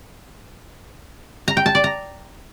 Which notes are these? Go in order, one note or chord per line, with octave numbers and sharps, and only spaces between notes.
A#5
G5
A5
D5
A#5